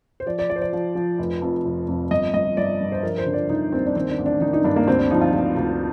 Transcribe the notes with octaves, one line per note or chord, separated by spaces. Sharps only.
C5
F3 D5
D5
F3 D5
C5
D5
F3
F3
F1
F2
F1
F2
G1 D#5
G1 D#5
G1 D5
G2
C5
F3 A#4
C5
D3
D5
D3 D#4
D#2 C4
D4
D#3 C4
D4
A1
D4
D#3 D#4
D#4
G2 D4
A#3
D2 C4
D4
F3 D#4
F4
D2
D2